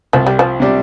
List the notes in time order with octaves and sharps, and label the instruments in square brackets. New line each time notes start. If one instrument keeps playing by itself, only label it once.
[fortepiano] C2 [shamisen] F3
[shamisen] G3
F3
[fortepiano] C3 G3 D4